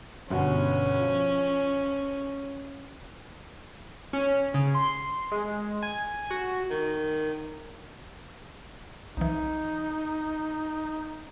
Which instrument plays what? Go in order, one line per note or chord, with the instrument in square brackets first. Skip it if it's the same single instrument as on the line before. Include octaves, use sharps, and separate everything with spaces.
[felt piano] G1 B2 F#5 [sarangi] C#4
[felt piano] F3
[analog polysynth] C#4
C#3
C6
G#3
G#5
F#4
[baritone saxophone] D#3
[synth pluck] C2 E3 [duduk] D#4